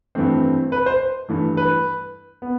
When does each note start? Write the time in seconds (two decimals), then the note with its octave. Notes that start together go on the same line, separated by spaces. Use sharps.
0.15 G2 E3 A3 C4
0.72 B4
0.86 C5
1.29 G2 E3 A3
1.57 B4
2.42 B3